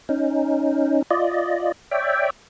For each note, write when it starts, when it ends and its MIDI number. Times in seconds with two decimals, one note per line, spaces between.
0.09 1.02 61
0.09 1.02 63
1.11 1.72 65
1.11 1.72 74
1.11 1.72 75
1.91 2.30 73
1.91 2.30 74
1.91 2.30 76
1.91 2.30 79